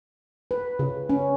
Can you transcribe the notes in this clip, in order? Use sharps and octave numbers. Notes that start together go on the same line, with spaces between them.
B4
C#3
C#4